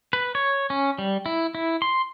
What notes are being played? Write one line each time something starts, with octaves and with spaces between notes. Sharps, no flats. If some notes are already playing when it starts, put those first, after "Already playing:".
B4
C#5
C#4
G3
E4
E4
C6